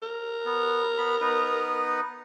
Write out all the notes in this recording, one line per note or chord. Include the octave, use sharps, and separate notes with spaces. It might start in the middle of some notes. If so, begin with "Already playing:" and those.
A#4
B3
B3 B5
B3 D#4 B4